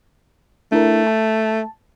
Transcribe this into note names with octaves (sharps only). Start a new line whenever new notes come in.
A3 D4 E4 A#4
A5